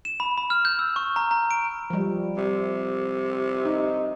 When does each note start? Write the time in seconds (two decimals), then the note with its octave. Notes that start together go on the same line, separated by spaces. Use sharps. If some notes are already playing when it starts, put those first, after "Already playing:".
0.05 E7
0.20 B5
0.37 B5
0.50 F6
0.65 G6
0.79 E6
0.96 C#6
1.16 A#5
1.31 A#5
1.51 D7
1.90 F3 G3
2.37 C3
3.65 D#4